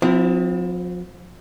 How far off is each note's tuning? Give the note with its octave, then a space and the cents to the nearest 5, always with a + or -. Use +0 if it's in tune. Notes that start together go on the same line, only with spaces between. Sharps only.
F3 +40 C4 -15 E4 +0